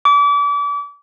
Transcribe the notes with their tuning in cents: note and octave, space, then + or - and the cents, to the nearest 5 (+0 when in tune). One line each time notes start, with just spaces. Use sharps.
D6 -35